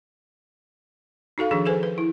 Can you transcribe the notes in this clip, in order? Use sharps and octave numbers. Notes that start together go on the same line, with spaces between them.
D#4 F#4 A4 F5
D#3 F3 D4 G#4
G#4 A4 B4 C5 G#5
B4
E4